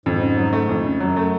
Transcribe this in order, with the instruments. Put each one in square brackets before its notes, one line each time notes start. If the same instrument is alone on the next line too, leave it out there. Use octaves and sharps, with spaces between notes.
[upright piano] F2 [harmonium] G#2
[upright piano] C#3
F#3
A3
F2
C#3
[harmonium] F#2 [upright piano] F#3
[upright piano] A3